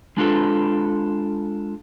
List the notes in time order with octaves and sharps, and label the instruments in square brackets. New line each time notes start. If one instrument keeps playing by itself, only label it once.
[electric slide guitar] G#3 D4 F4 A4